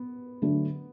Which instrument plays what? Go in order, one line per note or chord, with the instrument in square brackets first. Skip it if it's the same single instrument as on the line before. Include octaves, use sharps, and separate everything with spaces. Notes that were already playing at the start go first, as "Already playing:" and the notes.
Already playing: [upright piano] B3
[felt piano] D3 F#3 A3 D4